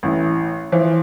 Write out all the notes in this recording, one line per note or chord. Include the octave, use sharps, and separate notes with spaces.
A1 E3
E3 F3 C5